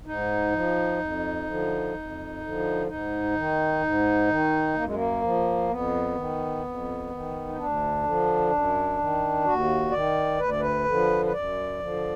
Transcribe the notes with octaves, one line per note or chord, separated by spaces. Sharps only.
G#2 D#4
F3
F2
D3 F3
F2
D3 F3
G#2 D#4
D#3
G#2
D#3
F#2 A#3
G#3
A#3
F3
F2 B3
D#3
F2
D#3
D#4
D2 D4
D3 F3
F#2
D#3
D#2 F#4
D#3 D5
D2 B4
D5
B4
D3 F3
B4
F#2 D5
D3 F3